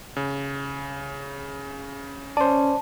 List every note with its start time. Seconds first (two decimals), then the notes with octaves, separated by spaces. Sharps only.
0.16 C#3
2.37 C#4 C5 D5 A5